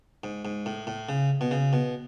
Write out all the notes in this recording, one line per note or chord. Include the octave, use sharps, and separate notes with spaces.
G#2
G#2
A2
A2
C#3
B2
C#3
B2